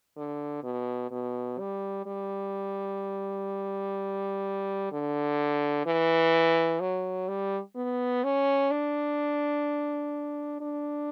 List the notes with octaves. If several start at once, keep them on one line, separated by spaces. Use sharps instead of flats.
D3
B2
B2
G3
G3
D3
E3
F#3
G3
B3
C#4
D4
D4